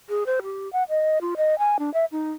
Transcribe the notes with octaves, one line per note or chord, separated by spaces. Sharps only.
G#4
C5
G4
F#5
D#5
F4
D#5
G#5
D4
E5
D#4